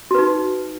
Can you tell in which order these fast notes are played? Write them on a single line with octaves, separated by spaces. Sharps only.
F#4 B4 D#4